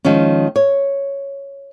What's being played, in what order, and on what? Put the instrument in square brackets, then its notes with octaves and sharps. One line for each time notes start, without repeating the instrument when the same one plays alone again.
[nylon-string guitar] D#3 F3 G#3 C#4
C#5